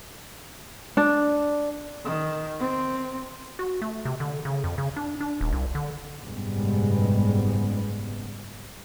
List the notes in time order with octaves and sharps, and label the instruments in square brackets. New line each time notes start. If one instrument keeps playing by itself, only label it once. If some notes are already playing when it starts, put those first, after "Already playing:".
[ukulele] D4
[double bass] D#3
C4
[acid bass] F#4
A3
C3
D3
C#3
F2
C#3
D4
D4
D#1
C2
D3
[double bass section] F#1 B1 G#2 G3 G#3 B3